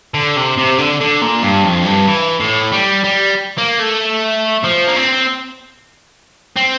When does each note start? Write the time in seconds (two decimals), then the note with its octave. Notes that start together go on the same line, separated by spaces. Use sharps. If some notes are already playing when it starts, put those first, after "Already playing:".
0.14 D3
0.36 C3
0.58 C3
0.78 D3
1.00 D3
1.22 A#2
1.43 G2
1.64 F2
1.86 G2
2.07 E3
2.40 A2
2.72 G3
3.04 G3
3.58 A#3
3.79 A3
4.64 F3
4.87 A#3
4.96 C4
6.56 C4